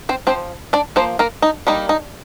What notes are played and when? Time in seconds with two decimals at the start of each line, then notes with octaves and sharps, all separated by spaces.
0.09 C4 C5
0.27 F3 C4 C5
0.73 D4 D5
0.96 F3 A#3 C5
1.19 A#3 A#4
1.42 D#4
1.67 G3 A#3 D#4
1.89 D#4